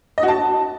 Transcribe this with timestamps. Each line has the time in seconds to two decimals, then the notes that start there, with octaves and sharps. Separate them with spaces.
0.18 D#5
0.23 F#4
0.28 A5